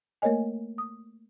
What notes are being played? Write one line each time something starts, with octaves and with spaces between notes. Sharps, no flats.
A3 A#3 A#4 C#5 D#5 G#5
D#6